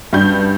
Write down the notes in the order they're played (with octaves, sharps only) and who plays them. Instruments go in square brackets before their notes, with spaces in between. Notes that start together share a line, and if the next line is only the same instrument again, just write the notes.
[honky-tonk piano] G2 G6